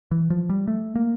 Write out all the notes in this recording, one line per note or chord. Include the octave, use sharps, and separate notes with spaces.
E3
F3
G3
A3
A#3